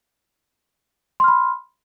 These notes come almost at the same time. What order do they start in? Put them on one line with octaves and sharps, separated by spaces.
C6 F6 B5